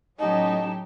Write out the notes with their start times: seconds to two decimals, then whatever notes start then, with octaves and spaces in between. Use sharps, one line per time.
0.19 A2 F#3 C#4 D#4 G4 D#5 A5